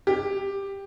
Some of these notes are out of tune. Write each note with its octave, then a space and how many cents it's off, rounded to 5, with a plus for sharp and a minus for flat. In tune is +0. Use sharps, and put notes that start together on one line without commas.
G4 +10